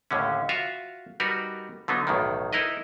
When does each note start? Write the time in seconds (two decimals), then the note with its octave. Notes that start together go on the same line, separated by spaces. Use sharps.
0.11 D#2 A2 D3 C#4
0.49 F4 F#4 E5 F5
1.20 G3 D#4 F#4 A#4 B4
1.88 D3 F#3 B3 D#4
2.07 B1 E2 A2 D#3
2.53 D#4 E4 A#4 B4 D#5